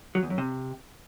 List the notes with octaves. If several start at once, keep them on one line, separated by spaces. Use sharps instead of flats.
F#3
E2
F#2
C3